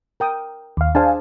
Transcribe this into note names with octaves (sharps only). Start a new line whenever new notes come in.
A#4 G5 D#6
D#2 F5
D4 G#4 C5 F5 G#5 A5